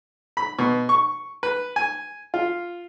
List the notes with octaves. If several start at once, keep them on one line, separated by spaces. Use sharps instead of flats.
B5
B2
C#6
B4
G#5
F4